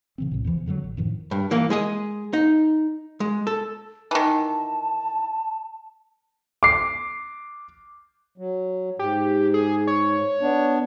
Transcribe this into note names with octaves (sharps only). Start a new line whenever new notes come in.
C#3 E3 C4
C2 A2
E2 B2 E3 F3
F#2 D3 D#3 F#3
A1
F#2 A2 D#3 F3
G2
E3 A#3
G#3 G#4 D#5
D#4
G#3
A4
D#3 E3 A5
D6 C7
F#3
G#2 G4
G#4
C#5
B3 D4